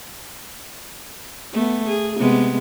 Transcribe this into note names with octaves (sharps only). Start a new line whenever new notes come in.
A3 B3
G#4
C3 G#3 B3